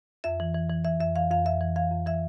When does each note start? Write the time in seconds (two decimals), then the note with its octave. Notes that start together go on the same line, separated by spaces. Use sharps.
0.24 F2 E5
0.40 E3
0.54 E3
0.70 E3
0.85 E3 E5
1.00 F2 E5
1.16 E3 F5
1.30 F2 F5
1.46 F2 E5
1.61 E3
1.76 E3 F5
1.91 F2
2.06 E3 E5